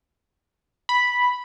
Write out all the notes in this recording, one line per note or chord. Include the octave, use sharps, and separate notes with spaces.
B5